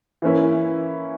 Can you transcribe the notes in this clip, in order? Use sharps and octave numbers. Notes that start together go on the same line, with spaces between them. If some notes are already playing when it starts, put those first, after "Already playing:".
E3 A#3 C#4 E4